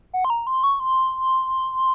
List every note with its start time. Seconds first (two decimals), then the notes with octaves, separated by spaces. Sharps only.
0.13 F#5
0.25 C6
0.30 A#5
0.47 C6
0.64 C#6
0.80 C6